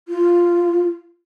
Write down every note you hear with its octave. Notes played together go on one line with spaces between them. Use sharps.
F4